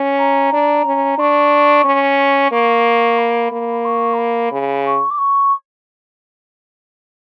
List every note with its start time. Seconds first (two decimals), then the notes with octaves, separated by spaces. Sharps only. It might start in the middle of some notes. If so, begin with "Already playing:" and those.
Already playing: C#4
0.18 A#5
0.53 D4
0.85 C#4
1.18 D4 C#6
1.85 C#4
2.19 C#6
2.52 A#3 C#6
3.18 B5
3.52 A#3
3.84 C#6
4.13 A#5
4.18 B5
4.52 C#3
4.85 C#6
5.10 D6
5.17 C#6